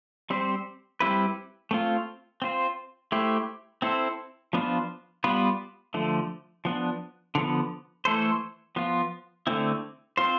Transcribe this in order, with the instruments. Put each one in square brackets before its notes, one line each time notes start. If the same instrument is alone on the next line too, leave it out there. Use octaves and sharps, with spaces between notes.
[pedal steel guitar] G3 C4 G4 C5
G3 C4 E4 G4 B4
A3 C4 F4
C4 F4 C5
A3 E4 G4 C5
C4 E4 A4 C5
F3 B3 D4 F4 C5
G3 B3 F4 B4
D3 F3 A3
F3 B3 D4
D3 F3 B3
E3 A3 E4 A4 C5
F3 B3 F4
D3 A3 C4 E4
C4 F4 C5